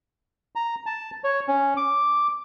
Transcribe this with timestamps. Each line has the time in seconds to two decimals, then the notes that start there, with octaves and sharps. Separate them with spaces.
0.56 A#5
0.86 A5
1.24 C#5
1.48 C#4
1.77 D6